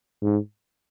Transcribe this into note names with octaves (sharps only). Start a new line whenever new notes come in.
G#2